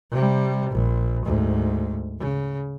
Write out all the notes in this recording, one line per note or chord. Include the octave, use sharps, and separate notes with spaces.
C3 G3
A#1
D2 G#2
C#3